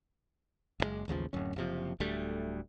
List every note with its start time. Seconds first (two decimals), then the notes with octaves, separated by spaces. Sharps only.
0.80 F#1 C#3 G#3
1.08 A1 D#2 C#3 F3
1.33 D1 F#2 C#4
1.56 F#1 C3 F3
2.00 D1 D2 G3 A3